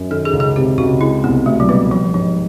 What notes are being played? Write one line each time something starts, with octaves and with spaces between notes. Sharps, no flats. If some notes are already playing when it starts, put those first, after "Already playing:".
Already playing: F#2
D#3 A4
G#4
C#2
G#4
C3 G4
C#2 F#4
G#3 E4
C2 B3
B2 A3
F#3
G3 B3
F3 G3
G#2 F3